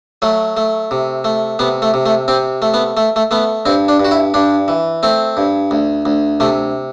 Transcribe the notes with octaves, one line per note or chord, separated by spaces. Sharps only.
F#3 A3
A3
C3
A3
C3 B3
A3
C3
A3
C3 C4
A3
B3
A3
A3
A3 B3
G2 C4
D4
G2
F#4
E4
G2 D4
E3
A3 C4
G2
D2
D2
C3 A3